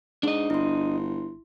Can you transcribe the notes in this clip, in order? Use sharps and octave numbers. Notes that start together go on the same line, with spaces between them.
G#2 D4 D#5
G1 E4 C6